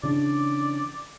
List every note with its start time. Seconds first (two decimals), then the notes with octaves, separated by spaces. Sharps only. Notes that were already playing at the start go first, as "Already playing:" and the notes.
0.03 C#3 E3 D4 D5